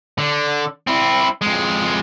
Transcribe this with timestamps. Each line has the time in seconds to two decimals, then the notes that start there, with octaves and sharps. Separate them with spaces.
0.18 D3
0.87 C4 E4
1.42 F2 G#3